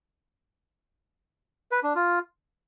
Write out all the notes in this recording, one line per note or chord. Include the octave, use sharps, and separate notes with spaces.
B4
D4
F4